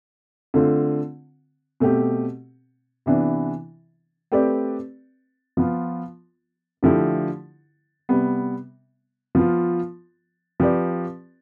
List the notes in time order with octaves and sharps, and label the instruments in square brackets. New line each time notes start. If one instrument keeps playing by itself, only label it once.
[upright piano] D3 A3 C4 F4
B2 A3 C4 G4
C3 E3 B3 D4
A3 C4 G4 B4 D5
F3 B3 F4
D3 F3 A3 E4 G4
C3 G3 B3
F3 B3 F4
F3 C4 G4 B4 D5